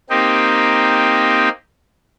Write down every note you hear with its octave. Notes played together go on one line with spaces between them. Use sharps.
A#3 C4 D#4 G4